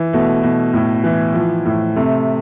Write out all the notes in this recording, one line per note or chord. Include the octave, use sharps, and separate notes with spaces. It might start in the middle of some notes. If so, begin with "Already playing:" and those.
Already playing: E3
B2 A3
B2
A2
E3
F3
A2
C3 A3